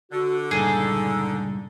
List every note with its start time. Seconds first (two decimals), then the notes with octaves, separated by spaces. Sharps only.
0.12 D3 F#4
0.51 C#2 G2 A#2 D#4 G#4 A4